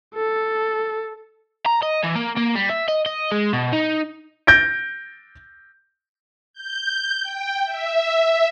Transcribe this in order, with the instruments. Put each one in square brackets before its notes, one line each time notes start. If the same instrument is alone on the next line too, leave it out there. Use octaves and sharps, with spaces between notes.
[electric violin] A4
[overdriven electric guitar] A#5
D#5
E3
A#3
A#3
G3
E5
D#5
D#5
G#3
B2
D#4
[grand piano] G6 A6 A#6 D7
[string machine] G6
G5
E5